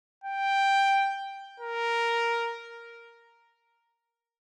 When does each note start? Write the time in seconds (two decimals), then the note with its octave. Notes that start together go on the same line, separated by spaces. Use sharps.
0.24 G5
1.60 A#4